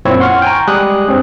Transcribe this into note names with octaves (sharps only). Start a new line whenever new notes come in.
F#2 A#2 C4 E4 C#5
F#5 C6 C#6 F6
G5 G#5 A#5
G3 G#3 G4 D#6 F#6
G2 C4 C#4